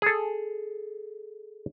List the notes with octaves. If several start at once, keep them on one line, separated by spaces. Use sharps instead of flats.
G#4 A4